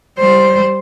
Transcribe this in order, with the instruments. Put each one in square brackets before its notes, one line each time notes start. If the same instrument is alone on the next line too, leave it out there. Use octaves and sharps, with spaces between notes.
[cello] G3 C5